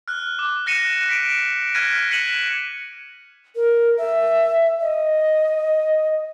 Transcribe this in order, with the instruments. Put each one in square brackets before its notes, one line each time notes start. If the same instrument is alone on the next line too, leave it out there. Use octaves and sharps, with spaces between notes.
[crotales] F6 F#6
D6
F#6 A#6 C#7 D#7 E7
B6 D7 E7
F6 F#6 G#6 A#6 B6 D#7
F#6 B6 C#7 D#7 E7 F#7
[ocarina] A#4
E5
D#5